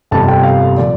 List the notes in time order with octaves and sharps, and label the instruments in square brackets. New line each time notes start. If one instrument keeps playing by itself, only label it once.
[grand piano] G1 F2 C3 G3 A5
G5
F5
A#2 F3 D5